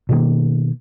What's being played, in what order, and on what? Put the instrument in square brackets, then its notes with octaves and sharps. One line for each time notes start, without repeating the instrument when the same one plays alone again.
[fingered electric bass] B2 D#3 A#3